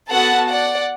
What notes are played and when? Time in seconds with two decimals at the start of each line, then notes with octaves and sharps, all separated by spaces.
0.10 B3 F#4 A4 F#5 A5
0.50 D5 F#5